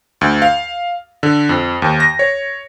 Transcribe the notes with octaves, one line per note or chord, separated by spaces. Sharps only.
D2
F5
D3
F2
D#2
A#6
C#5